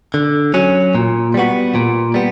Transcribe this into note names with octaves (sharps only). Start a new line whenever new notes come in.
D3
F#3 C#4
A#2
G3 B3 F#4
A#2
G3 B3